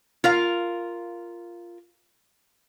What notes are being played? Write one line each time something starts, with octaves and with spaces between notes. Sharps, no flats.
F4 A#4 F5